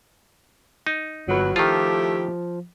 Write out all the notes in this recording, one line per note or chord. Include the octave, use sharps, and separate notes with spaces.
D#4
G1 F2 F#3 B4
D#3 F3 A3 E4 F4 G4